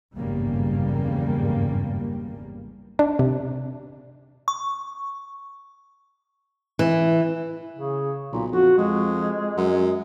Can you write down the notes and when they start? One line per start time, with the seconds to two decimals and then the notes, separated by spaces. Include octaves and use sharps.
0.14 G#1 E2 G2 C#3 G3 A#3
2.99 D4
3.19 C3
4.48 C#6
6.79 E3
7.77 C#3
8.32 B1 A#2
8.52 F2 F#4
8.78 F2 G#3
9.57 F#2